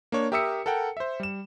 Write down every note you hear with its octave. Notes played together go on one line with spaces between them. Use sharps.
A#3 D4 C#5
G4 A#4 E5 D#6 E6 C#7
A4 A#4 F#5 G5
C5 E5
G3 E7